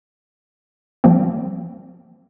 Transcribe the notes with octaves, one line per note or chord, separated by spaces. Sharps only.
F3 G3 A#3 C4